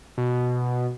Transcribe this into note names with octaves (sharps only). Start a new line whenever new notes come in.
B2